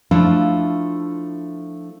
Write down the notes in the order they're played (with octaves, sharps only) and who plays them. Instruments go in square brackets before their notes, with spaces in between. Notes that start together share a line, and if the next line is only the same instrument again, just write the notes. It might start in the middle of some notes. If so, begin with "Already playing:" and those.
[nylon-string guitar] F3 A3 D4 E4 F4